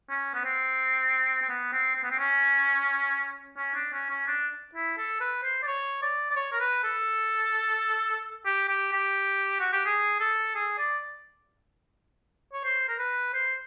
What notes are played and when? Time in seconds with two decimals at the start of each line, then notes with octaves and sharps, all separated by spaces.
0.10 C#4
0.34 B3
0.45 C4
1.42 C4
1.49 B3
1.73 C4
1.96 C4
2.03 B3
2.10 C4
2.19 C#4
3.58 C#4
3.75 D4
3.93 C#4
4.10 C#4
4.28 D4
4.75 E4
4.98 A4
5.20 B4
5.43 C5
5.63 D5
5.67 C#5
6.02 D5
6.31 D5
6.36 C#5
6.53 A#4
6.60 B4
6.84 A4
8.46 G4
8.68 G4
8.92 G4
9.60 F#4
9.73 G4
9.85 G#4
10.20 A4
10.55 G#4
10.78 D5
12.53 C#5
12.64 C5
12.89 A#4
12.98 B4
13.34 C5